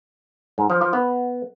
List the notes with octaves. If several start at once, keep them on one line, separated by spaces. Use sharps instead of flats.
G#2
F3
F3
B3